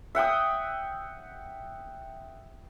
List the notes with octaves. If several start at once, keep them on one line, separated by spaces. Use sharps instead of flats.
E5 F#5 G5 D#6